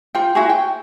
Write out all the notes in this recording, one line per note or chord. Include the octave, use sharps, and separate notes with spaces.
F4 G5
E4 F#4 G#4
G5